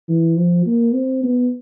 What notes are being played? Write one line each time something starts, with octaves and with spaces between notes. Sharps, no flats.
E3
F3
A#3
C4
B3